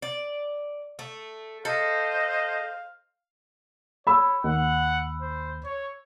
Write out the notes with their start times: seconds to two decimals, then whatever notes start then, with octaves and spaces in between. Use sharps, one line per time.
0.02 D5
0.99 A3
1.65 A4 C5 D#5 F5
4.07 C#5 B5 E6
4.44 D#2 F#5
5.22 C5
5.64 C#5